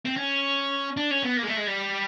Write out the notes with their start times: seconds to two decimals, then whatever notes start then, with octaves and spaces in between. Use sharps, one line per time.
0.06 C4
0.17 C#4
0.97 D4
1.11 C#4
1.23 B3
1.37 A#3
1.43 G#3
1.47 A3
1.57 G#3
1.67 G3